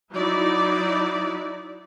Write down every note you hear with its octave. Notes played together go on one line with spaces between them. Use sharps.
F#3 D#4 E4 D5